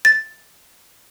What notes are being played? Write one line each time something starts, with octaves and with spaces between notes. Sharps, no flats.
A6